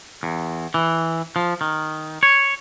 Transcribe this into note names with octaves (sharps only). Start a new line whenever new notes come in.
E2
E3
F3
D#3
C#5